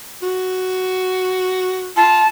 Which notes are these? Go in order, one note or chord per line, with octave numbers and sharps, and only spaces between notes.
F#4
F4 A5